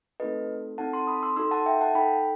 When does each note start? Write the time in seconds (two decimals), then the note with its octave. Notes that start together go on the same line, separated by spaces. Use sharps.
0.20 A3 C4 D#4 F#4 A4 B4 D#5
0.78 C4 D#4 A4 F#5 A5
0.93 A5 C6
1.07 B5 D#6
1.23 C6 E6
1.36 D#4 F#4 A4 C6 E6
1.51 F#5 A5
1.66 E5 G5
1.81 F#5 A5
1.95 D#4 A4 G5 B5